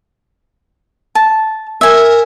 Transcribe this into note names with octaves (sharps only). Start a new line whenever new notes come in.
A5
A#4 E5 G#5